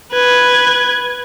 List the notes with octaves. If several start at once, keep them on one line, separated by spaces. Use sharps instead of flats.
B4 G#6